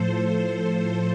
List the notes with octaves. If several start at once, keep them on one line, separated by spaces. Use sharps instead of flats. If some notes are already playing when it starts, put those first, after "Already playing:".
Already playing: A2 F3 A4 C5